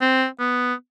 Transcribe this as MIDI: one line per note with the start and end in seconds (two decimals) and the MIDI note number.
0.01 0.26 60
0.40 0.74 59